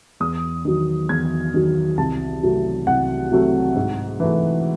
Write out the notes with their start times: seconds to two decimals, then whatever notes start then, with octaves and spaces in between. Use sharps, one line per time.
0.20 E2 D#6
0.65 D#3 F#3
1.09 E2 G#6
1.54 D#3 F#3
1.98 C2 A5
2.43 C3 F#3 A3
2.87 C2 F#5
3.32 C3 F#3 A3
3.76 G#2
4.20 E3 A3